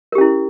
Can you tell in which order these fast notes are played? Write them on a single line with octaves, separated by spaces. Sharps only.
A#4 G4 C#4 E4